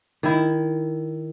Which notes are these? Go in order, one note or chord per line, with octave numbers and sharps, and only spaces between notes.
D#3 E4